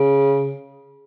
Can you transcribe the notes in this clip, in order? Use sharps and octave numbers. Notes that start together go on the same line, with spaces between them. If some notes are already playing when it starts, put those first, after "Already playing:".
Already playing: C#3